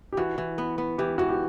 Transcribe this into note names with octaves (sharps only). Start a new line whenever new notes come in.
G4
E3 F#4
E3
B3
B3
E3 G4
E3 F#4
G4